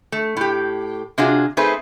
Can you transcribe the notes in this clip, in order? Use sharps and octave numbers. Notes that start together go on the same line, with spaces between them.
A3
A2 G4
C3 D4 F4 F#4 G#4
A3 C4 D#4 G#4 B4 C5